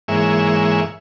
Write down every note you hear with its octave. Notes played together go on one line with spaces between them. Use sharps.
G#2 E3 G#3 A#3 C#5 E5